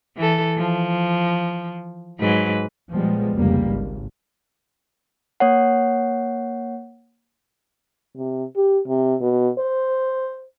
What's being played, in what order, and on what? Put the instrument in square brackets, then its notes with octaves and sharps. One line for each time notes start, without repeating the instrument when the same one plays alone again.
[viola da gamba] E3 A4
F3
G#2 F#3 B4
[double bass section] A#2 F3 G3 G#3 B3
F1 C#2 G3 A#3
G#1
[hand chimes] A#3 C#5 F#5
[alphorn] C3
G4
C3
B2
C5